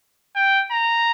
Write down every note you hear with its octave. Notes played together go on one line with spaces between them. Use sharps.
G5
A#5